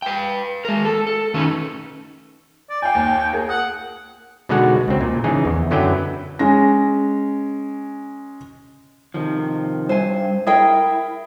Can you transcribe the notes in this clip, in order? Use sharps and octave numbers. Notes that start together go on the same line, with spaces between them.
B4 G5
G#3 A#4
A4
A4
D#3 A3 B3 C#4 D#4
D5
F5 G5 G#5
D#2
A#3 G#4
F#5 D#6
B2 D3 G#3 D#4 F#4 F#5
C#2 C4
A#2
C#3 E3 D#4 G#4
E2
F#2 D3 F#3 E4 B4 G5
G#3 C#4 A#6
C3 D#3 F3
G2 C5 G#5
E4 G#4 A#4 G5